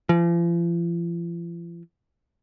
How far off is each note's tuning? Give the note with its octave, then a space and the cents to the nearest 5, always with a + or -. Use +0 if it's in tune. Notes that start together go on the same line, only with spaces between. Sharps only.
F3 -45